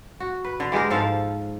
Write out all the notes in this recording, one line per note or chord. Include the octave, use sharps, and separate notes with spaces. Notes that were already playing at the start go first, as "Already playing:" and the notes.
F#4
B4
D3
E3 G#3 G4 A#4
G#2 F3 A4 F5